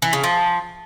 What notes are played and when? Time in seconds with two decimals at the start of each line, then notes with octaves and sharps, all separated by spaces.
0.02 E3
0.13 C#3
0.24 F3